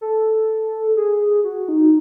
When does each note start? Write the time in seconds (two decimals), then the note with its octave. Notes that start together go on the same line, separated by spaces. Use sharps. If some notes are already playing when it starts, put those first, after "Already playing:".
0.01 A4
0.96 G#4
1.44 F#4
1.68 D#4